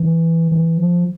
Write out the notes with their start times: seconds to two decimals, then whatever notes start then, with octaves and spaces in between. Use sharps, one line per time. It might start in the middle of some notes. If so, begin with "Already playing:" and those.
Already playing: E3
0.52 E3
0.78 F3